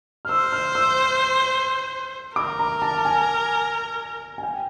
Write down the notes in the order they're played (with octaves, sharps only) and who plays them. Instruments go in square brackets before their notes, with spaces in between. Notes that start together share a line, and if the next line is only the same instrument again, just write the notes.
[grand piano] F6
[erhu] C5 [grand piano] E6
[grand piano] F6
E6
[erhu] A#4 [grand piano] D6
[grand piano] A#5
A5
G#5
G#5
G5